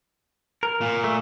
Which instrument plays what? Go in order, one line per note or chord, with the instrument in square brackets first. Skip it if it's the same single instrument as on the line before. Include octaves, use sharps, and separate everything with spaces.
[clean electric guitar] A#4
[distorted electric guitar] A#2
[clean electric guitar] A3